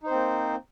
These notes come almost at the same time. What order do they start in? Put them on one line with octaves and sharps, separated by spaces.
D#4 C5 C4 A#3